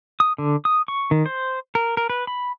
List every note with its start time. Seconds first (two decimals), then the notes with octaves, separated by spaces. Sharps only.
0.20 D#6
0.38 D3
0.65 D#6
0.88 C#6
1.11 D#3
1.26 C5
1.75 A#4
1.97 A#4
2.10 B4
2.27 B5